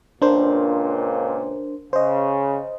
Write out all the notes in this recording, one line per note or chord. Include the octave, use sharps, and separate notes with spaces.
C#2 A#2 D4 A#4 C5
C#3 C5 D#5